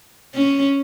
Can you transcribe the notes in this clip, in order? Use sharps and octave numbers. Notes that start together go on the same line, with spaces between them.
C#4